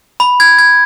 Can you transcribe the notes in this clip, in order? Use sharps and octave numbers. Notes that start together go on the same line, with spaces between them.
B5
G#6
G#6